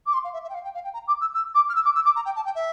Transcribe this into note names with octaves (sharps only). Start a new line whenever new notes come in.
D6
C6
F5
E5
E5
G5
F5
G5
F5
G5
A#5
D6
E6
E6
D6
F6
E6
D6
E6
D6
A#5
G5
A5
G5
E5